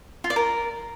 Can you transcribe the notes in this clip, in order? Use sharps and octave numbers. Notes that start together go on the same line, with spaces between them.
F4
D5
A#4